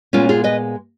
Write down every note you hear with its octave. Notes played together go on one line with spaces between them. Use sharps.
A#2 G#3 B3 C#4 F4
F4 G#4
B4 D#5